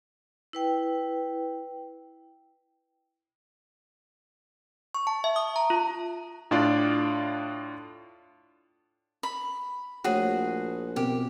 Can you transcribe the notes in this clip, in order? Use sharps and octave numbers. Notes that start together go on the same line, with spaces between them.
E4 B4 G5
C#6
A5
E5
D#6
A#5
F4
A2 D4 F4 D5
B5
A#1 A3 F#4 G#4 C#5 G5
B2 C4 G4 A#4